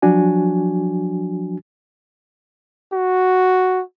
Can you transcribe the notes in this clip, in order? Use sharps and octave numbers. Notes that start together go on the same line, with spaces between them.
F3 F#3 D4 F#4 G#5
F#4